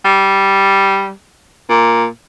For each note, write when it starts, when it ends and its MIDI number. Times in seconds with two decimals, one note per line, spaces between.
0.05 1.11 55
1.69 2.06 46